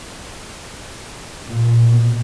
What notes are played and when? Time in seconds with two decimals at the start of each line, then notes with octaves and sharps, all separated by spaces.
1.49 A#2
1.89 B2